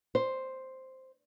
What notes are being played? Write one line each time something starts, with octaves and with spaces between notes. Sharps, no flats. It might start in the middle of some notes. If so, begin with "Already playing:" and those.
C5